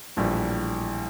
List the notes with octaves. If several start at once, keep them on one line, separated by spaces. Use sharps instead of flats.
A#1 A2 E3 G3